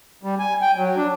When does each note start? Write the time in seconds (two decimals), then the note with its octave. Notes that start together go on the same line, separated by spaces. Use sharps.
0.23 G3
0.39 G#5
0.62 G5
0.76 F#3
0.97 D4